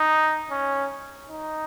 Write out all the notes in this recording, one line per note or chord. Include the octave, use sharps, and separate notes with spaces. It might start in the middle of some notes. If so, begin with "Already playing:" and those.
Already playing: D#4
C#4
D#4